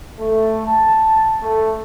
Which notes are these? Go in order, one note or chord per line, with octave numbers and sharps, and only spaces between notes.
A3
A5
A3